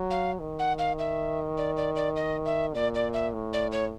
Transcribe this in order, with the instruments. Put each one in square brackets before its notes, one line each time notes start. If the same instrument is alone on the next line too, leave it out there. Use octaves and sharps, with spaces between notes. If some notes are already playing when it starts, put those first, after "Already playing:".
Already playing: [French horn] F#3
[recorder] F5
[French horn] D#3
[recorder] F#5
F5
E5
D5
D5
D5
D#5
E5
[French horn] A#2 [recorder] D5
[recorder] D5
E5
[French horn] A2
[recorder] D5
C#5